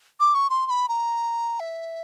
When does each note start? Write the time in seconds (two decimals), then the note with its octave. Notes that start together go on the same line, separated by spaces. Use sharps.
0.20 D6
0.35 C#6
0.50 C6
0.67 C6
0.70 B5
0.89 A#5
1.60 E5